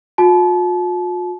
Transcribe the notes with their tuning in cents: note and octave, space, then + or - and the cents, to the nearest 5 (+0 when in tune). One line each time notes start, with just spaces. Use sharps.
F4 +45 A5 -35